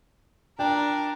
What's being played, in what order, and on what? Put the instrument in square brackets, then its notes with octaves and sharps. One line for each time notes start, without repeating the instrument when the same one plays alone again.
[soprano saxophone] D4 [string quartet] A#4 [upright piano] G5 A#5